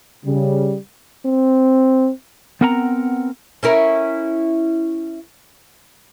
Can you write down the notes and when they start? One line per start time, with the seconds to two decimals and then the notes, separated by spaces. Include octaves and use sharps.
0.25 C#3 G3
1.26 C4
2.61 B3 C4 A#4 F#5 G5 A#5
3.63 C#4 E4 A#4